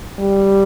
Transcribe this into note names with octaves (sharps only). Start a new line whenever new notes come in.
G3